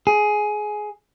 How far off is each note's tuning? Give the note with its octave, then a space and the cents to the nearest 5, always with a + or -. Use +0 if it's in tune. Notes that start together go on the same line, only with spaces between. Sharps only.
G#4 +15